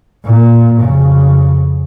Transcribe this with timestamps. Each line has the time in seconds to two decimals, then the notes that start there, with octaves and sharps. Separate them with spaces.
0.25 A#2
0.81 F2 C#3